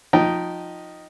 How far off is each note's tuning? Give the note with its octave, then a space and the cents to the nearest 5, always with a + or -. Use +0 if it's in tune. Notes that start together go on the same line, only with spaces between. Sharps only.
F3 +20 D#4 +0 G5 -15